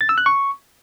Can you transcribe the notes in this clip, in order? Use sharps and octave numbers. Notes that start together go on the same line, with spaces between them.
A6
E6
F#6
C#6